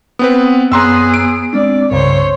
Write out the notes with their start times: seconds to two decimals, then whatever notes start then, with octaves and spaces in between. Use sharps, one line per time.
0.19 B3 C4 B4 D#6
0.72 F#2 B3 G#4 C#5 A#5 C6 E6 F#6
1.14 D7
1.53 G#3 C4 D4 D5
1.91 C2 G2 C#3 C5 C#5